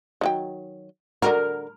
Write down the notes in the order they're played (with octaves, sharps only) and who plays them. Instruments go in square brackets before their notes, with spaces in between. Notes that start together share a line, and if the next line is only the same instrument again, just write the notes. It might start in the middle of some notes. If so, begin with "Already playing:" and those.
[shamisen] D#3 F#3 G5
[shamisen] D3 D#3 F#4 [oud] A#4